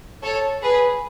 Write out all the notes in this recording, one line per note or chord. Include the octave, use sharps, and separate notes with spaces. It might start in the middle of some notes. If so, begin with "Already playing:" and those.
A4 C#5
G#4 B4